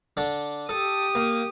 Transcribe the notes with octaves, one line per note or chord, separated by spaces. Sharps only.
D3 D4
G4 A4 D#6
A#3